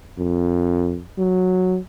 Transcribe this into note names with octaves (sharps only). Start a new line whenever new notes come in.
F2
F#3